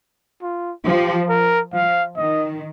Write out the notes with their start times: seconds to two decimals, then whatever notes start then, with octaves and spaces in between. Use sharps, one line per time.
0.42 F4
0.86 F3 G4
1.29 A#4
1.74 F3 F5
2.17 D#3 D#5